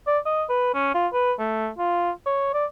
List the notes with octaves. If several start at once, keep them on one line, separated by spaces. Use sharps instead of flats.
D5
D#5
B4
C#4
F4
B4
A3
F4
C#5
D5